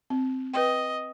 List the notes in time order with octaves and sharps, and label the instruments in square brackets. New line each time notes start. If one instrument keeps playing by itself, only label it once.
[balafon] C4
[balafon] B4 G5 [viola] D#5